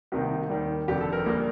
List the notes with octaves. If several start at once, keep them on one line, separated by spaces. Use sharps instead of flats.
C2 C3 D#3 A#3 G4
D#2 D#3 G3
F1 F2 D3 G4
A4
A#4
A#1 A#2 G3 A#3